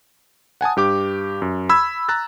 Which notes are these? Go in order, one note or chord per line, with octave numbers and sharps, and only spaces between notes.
F#5 G#5 A5 D#6
G2 G4 D6
F#2
B5 E6 G#6
A#5 E6 F#6 A6